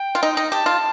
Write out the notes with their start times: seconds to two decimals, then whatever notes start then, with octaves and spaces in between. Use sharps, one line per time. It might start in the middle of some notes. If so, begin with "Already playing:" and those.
Already playing: G5
0.15 F4
0.23 D#4
0.37 D#4
0.52 G4 A5
0.66 F4